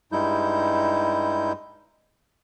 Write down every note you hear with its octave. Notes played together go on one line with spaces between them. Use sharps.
G2 G3 G#3 D#4 E4 G6